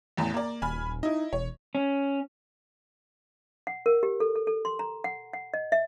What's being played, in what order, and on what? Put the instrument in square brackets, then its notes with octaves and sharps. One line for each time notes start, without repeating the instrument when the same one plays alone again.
[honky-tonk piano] A1 E2 A2
A#3 D5
[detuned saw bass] D#1 [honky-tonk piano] G#5 B5 F6
[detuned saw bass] D#4 [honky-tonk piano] E4 D#5
[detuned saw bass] E1 [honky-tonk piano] C#5
[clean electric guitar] C#4
[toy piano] F#5
A#4
G4
A4
A4
A4
C6
A#5
F#5
F#5
D#5
E5